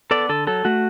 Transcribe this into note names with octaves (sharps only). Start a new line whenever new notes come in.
B3 A4 D5
D3 A4
F#3 A4
A3 F#4